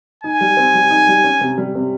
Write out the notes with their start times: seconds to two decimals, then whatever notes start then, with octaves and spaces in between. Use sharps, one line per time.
0.24 D#4 G#5
0.41 G3
0.57 C4
0.75 G3
0.90 D#4
1.08 G3
1.24 C#4
1.41 C3
1.58 G3
1.75 C3